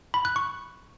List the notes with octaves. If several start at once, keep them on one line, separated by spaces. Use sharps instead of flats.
B5
F#6
C#6